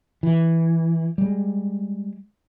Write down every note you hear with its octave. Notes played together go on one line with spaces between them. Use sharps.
E3
G3 G#3